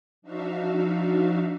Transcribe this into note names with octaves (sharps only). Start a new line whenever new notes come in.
F3 D4 D#4 F#4 E5 F5